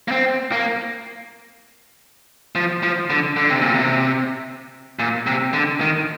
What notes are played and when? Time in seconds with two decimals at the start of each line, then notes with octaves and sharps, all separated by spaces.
0.08 A#3
0.11 C4
0.52 A#3
2.55 F3
2.83 F3
3.10 D3
3.37 D3
3.50 C3
3.62 A#2
3.74 C3
4.99 A#2
5.27 C3
5.53 D3
5.81 D#3